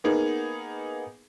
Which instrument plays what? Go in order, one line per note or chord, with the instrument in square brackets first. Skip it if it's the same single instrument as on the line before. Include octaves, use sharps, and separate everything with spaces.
[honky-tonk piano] A#3 B3 D#4 G#4